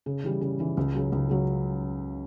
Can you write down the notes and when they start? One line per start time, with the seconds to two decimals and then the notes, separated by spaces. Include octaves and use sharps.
0.06 C#3
0.24 E3 G3
0.41 C#3
0.59 E3 G3
0.77 C#2
0.94 C#3 F#3
1.12 C#2
1.29 C#3 F#3